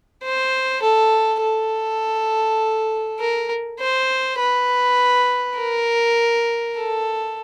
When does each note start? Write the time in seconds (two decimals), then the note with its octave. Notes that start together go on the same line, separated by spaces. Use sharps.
0.24 C5
0.83 A4
1.42 A4
3.20 A#4
3.80 C5
4.39 B4
5.58 A#4
6.76 A4